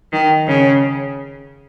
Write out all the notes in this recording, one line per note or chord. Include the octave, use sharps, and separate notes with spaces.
D#3
C#3